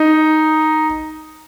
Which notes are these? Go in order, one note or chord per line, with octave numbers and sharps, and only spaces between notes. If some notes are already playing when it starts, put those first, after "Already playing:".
Already playing: D#4